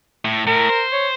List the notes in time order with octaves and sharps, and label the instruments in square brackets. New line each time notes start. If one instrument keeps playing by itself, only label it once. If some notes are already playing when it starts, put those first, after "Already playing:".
[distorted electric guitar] A2
[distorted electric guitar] A2 [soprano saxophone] A#4
[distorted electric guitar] C5
[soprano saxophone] C#5